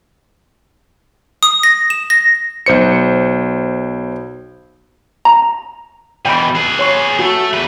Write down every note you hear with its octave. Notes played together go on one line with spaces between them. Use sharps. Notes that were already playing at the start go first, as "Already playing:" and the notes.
D#6
A#6
E7
A#6
B1 C5 C#7
A#5
B2 E3 G5 B5
G#4 B4
C#5 C6 C#6
A3 F#4
E2 B4